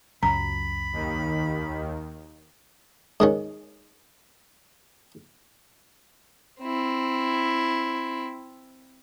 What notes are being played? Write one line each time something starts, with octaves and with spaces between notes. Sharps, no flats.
C#2 F#2 F#3 A#5 B5
D#2 D#3
G#2 D#3 C#4
C4 E4